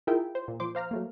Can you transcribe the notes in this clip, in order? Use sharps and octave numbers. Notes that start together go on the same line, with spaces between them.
E4 F4 G#4 A#4 E5 G5
C5
A#2
F3 C5 C6 D6
C5 F5 A#5 F6
F#3 A3 A#3